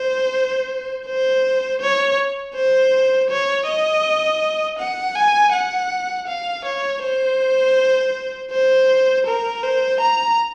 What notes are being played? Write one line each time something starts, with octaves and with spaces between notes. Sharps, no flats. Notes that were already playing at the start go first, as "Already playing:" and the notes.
Already playing: C5
C5
C#5
C5
C#5
D#5
F#5
G#5
F#5
F5
C#5
C5
C5
A#4
C5
A#5